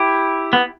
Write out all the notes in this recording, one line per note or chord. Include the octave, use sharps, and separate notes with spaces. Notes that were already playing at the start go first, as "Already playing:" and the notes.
Already playing: E4 G4
B3